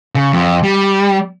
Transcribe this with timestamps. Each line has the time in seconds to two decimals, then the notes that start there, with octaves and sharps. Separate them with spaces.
0.15 C#3
0.33 F2
0.63 G3